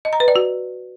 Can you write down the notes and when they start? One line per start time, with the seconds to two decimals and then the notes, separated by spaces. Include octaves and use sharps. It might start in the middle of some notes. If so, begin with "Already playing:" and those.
0.05 D#5
0.13 A#5
0.20 B4
0.28 D5
0.36 F#4